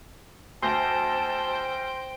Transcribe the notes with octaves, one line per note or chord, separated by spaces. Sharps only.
D2 C5 G5 A5 C6 G6 A#6